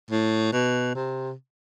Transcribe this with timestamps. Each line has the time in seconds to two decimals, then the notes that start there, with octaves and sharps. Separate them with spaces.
0.11 A2
0.53 B2
0.95 C3